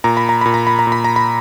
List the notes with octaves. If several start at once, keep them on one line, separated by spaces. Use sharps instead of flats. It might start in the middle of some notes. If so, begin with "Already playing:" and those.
A#2 A#5
B5
A#5
A#2 B5
A#5
B5
A#5
A#2
B5
A#5
B5